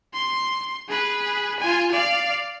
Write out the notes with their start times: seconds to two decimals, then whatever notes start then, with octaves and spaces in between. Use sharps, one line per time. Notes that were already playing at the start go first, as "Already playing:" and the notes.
0.14 C6
0.88 G#4 B4
1.60 F4 G#5
1.92 D5 F5